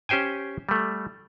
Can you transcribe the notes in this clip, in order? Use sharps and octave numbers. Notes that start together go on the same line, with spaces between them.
C#4 G4 C5 G5 G#5
G3 A3